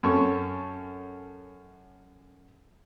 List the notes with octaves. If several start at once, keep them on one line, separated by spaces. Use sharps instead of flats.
F#2 C#4 A4 C#6